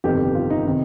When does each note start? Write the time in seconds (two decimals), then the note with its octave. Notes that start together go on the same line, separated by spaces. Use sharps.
0.04 G1 F2 C3 D#3 G4
0.35 F4
0.50 D#4
0.65 C3 D#3